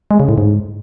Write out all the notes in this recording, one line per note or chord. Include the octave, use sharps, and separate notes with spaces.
G#3
C#3
A2
G#2